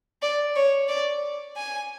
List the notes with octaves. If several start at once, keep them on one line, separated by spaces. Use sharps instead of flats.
D5
C#5
D5
G#5